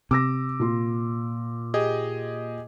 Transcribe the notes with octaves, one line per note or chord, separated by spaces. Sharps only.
C3 D6 E6 A#6
A#2 F4 C6
G4 G#4 D#5